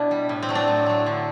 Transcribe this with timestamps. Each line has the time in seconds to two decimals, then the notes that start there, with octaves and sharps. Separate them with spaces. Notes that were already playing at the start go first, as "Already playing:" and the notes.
Already playing: B2 D4 E4
0.11 G3
0.29 A2
0.42 C4
0.49 F#3 A3
0.55 D4
0.68 A2
0.86 F#3 A3
1.06 D3